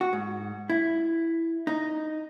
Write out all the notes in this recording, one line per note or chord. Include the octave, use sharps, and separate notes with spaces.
F#4
G#2
E4
D#4